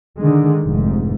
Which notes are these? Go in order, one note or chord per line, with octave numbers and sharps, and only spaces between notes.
D3 D#3 G#3
F1 G#2